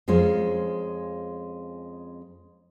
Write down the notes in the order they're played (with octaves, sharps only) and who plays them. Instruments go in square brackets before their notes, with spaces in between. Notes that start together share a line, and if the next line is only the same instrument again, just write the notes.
[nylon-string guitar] F2 G#3 C#4 F4 C5